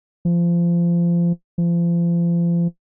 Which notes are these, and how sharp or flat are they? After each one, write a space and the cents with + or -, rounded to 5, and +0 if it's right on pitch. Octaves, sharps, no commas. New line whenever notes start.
F3 -25
F3 -35